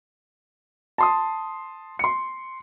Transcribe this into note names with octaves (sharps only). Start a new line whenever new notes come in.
A5 C6 D#6
C6 C#7